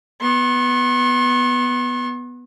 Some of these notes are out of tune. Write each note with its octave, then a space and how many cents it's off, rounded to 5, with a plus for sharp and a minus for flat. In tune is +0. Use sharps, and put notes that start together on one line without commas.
B3 +0 C6 +45